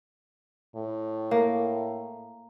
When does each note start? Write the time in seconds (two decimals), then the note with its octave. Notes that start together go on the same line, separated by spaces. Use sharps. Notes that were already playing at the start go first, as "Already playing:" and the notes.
0.76 A2
1.31 A#3